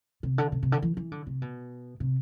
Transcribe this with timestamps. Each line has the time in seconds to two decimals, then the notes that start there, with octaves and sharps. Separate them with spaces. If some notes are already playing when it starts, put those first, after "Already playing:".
0.23 C3
0.38 D3
0.52 C3
0.63 C3
0.72 D3
0.82 E3
0.97 E3
1.12 D3
1.27 C3
1.42 B2
2.00 C3